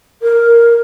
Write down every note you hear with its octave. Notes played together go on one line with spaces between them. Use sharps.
A#4